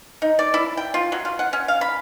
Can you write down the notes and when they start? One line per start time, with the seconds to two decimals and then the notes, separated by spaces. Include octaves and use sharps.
0.22 D#4
0.39 D5
0.54 E4
0.77 G5
0.94 F4
1.12 F#3
1.25 F4
1.39 F#5
1.53 C#4
1.68 F5
1.81 B5